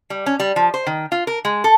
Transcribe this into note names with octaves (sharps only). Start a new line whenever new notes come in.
G3
C#4
G3
F3
C5
D#3
F4
A#4
G#3
A4